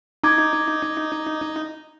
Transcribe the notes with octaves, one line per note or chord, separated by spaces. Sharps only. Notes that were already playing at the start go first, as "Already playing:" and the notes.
D#4 A#5 D6 G#6